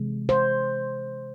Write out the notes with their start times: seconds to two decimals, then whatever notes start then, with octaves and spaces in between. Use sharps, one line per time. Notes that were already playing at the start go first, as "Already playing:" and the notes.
Already playing: C3 E3 G#3
0.29 C5